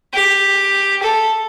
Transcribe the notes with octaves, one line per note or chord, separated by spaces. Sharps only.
G4
A4